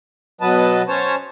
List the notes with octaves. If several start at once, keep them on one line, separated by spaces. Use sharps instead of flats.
B2 F#3 B3 B4 D#5 A5
C#4 C5 C#5 A5